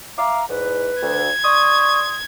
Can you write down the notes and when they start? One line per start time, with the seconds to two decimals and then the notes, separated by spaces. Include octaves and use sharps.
0.18 E5 F5 A#5 D6
0.50 E2 G#2 B4
1.02 D2 G#6
1.44 D5 C6 C#6 D#6